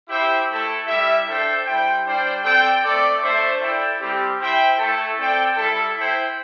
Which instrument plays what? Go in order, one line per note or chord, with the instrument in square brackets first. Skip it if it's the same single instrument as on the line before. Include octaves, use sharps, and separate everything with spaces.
[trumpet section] E4 G4 C5 E5 G5
A3 E4 A4
G3 E4 G4 E5
D4 A4 C5 E5 G5
G3 E4 C5 G5
G3 D4 C5 G5
C4 A4 D5 G5
A3 C4 A4 D5
A3 D4 A4 C5 E5
E4 A4 D5 G5
G3 C4 G4
E4 C5 E5 G5
A3 E4 A4
C4 A4 D5 G5
G3 E4 A4
E4 C5 G5